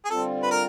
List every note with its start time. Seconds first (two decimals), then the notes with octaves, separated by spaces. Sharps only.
0.05 G#4
0.10 D3 G3 C4 F4 A4
0.43 B4
0.51 A#4